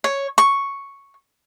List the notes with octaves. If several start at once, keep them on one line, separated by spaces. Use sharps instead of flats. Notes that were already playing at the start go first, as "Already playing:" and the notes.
C#5
C#6